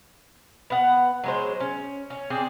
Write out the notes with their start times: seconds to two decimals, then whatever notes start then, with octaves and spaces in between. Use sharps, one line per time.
0.70 B3 F#5
1.24 F#3 G#3 C5
1.60 C#4
2.10 C#4
2.30 C4 D4 G#4